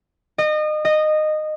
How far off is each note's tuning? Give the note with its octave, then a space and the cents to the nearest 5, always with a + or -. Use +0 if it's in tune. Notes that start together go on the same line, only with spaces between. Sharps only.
D#5 -30
D#5 -15